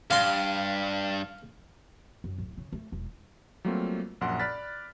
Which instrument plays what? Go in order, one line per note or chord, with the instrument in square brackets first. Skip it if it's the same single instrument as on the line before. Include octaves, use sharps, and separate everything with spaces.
[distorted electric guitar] G2 [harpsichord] F5 C6
[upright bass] F#2
D1
C#3
A3
E1
[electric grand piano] F#3 G3 A3 A#3 C4 F4
A#1 F#2 F#5 C6 D7
D5 B5 F6 F#6 A6 B6